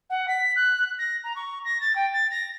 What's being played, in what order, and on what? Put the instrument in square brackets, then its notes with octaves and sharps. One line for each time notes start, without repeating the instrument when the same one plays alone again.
[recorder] F#5
B6
F#6
A#6
A#5
C#6
A#6
A6
G5
A6
A#6